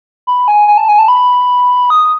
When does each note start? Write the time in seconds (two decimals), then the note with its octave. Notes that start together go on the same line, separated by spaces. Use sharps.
0.27 B5
0.48 G#5
0.68 G#5
0.78 A5
0.88 G#5
0.99 A5
1.08 B5
1.90 D#6